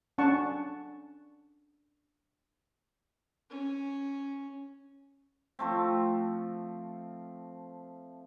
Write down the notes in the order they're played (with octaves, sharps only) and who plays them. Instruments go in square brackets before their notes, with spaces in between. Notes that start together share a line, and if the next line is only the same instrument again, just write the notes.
[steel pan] C#4 D4 F#5 A5 C#6
[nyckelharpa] C#4
[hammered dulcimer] F3 A3 C4